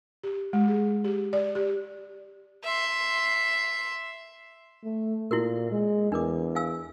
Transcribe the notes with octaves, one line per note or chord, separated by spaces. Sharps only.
G4
G#3
G#4
G4
D5
G4
E5 C6
A3
A#2 E4 F#4 A#4
G#3
E2 D4 A#4 D6
F5 G#5 E6